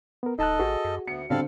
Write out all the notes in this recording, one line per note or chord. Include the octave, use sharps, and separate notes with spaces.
B3 A#4
D1 D#4 A4 D#5 A5 F#6
A1 F#4 G#4
F#2
D2 B3 C#7
A2 D3 G3 C4 A4 F5